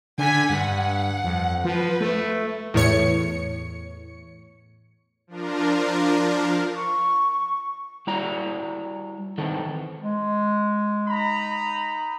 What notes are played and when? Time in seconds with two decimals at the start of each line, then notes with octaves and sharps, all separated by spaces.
0.18 D3 G#5 B6
0.50 G2 F#5
1.23 F2
1.64 F3 B4
2.00 A3
2.74 E2 A2 C#5 C#7
5.27 F3 D4 F4 A#4
6.76 C#6
8.07 G3 E4 F#4 D5 A#5
9.38 D#3 E3 C4 A4
10.01 G#3
11.06 D#4 A#5 B5